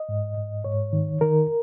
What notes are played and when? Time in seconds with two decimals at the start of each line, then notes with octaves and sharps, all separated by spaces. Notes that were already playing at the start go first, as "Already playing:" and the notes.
Already playing: D#5
0.09 G#2
0.37 G#2
0.64 G#2 C#5
0.93 D#3
1.21 D#3 A#4